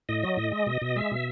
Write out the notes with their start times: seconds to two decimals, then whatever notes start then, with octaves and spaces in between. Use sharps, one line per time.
0.09 A2 D#5
0.23 F#3
0.37 A2
0.52 G#3
0.66 B2
0.82 B2
0.96 G#3 E5
1.12 B2